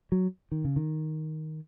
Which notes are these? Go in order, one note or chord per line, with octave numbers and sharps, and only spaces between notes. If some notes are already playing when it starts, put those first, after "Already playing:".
F#3
D#3
C#3
D#3